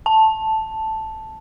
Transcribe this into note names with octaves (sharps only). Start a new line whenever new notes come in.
A5